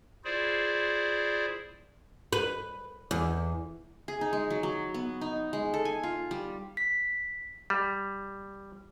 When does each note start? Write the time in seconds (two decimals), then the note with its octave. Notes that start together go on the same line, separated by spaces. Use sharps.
0.24 E4 F4 G#4 C5 D5
2.33 B4
3.11 E2
4.08 G#4
4.21 D#4
4.33 G#3
4.50 F#3
4.63 F#3
4.94 B3
5.21 D#4
5.53 G#3
5.74 A4
5.85 G#5
6.03 F4
6.31 G3
6.77 B6
7.70 G3